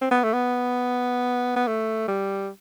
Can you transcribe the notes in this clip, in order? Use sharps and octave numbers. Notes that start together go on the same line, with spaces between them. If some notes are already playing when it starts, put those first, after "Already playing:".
C4
B3
A3
B3
B3
A3
G3